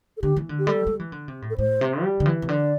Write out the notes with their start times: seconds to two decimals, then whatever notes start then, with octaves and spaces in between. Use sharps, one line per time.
0.17 A4
0.22 D3 G4
0.37 E3
0.49 D3
0.59 G4
0.67 G3 A4
0.87 G3
1.00 E3
1.12 D3
1.28 C3
1.42 A2
1.50 A4
1.58 A2 C5
1.81 C3
2.02 G3
2.20 D3
2.26 E3
2.42 C3
2.48 D3 D5